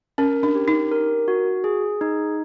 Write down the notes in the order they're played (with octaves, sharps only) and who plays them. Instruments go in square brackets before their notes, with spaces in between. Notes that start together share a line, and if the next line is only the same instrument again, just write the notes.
[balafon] C#4 [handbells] A#4
[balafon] D4
[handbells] G4
[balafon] D#4
[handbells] A#4
F#4
G#4
D#4